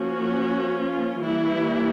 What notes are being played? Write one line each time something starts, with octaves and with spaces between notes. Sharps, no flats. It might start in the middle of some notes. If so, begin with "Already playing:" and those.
Already playing: F3 A#3 C#4 F#4
F4
E3 G3 A#3 E4